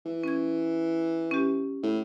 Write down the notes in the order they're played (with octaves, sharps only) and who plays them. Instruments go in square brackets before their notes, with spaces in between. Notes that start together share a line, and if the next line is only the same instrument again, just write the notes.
[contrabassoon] E3
[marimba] C#4 G#6
C#4 G4
[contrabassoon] A2